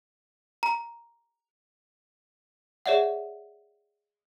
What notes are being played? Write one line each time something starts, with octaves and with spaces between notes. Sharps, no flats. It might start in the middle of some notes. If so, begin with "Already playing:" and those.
A#5
G#4 C#5 D5 E5 F#5